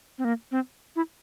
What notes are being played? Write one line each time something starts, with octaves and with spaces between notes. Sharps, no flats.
C4
A#3
C4
E4